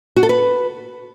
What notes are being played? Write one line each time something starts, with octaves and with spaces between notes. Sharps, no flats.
F#4
A4
B4